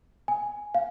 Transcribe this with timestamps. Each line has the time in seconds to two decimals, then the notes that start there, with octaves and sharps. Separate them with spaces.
0.28 G#5
0.75 F5